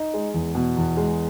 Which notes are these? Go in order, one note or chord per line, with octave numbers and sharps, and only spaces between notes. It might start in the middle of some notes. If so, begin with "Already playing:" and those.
Already playing: D#4
G#3
E2
B2
E2
G#3